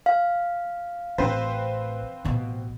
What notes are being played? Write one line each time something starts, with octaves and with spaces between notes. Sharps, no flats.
F5
A1 C4 B4 C5
A1 B2